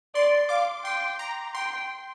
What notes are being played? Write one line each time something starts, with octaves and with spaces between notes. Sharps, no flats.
D5 C6
F5 D6
G5 C6
A#5
G5 C6